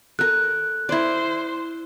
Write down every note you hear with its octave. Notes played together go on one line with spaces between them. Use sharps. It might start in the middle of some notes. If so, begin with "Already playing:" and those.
A4 A#4 F#6
E4 C5 D5